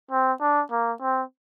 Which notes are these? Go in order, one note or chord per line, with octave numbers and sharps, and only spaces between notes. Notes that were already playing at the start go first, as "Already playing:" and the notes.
C4
D4
A#3
C4